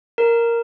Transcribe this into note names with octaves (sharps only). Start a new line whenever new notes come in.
A#4